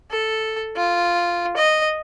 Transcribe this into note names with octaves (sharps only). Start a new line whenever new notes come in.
A4
F4
D#5